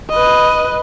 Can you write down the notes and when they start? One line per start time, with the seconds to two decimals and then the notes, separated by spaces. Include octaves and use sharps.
0.10 B4 D#5